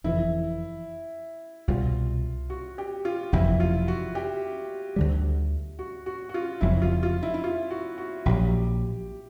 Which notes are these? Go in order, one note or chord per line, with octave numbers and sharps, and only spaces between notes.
F#1 F2 C#3 E3 E4
C2 B2 G3 F4
F#4
G4
F4
F#1 F2 C3 E3 E4
F4
F#4
G4
D2 D3 G3
F#4
F#4
F#4
F4
F1 F2 C#3 F#3 E4
F4
F4
E4
E4
F4
F#4
F#4
A#1 A#2 F#3 G4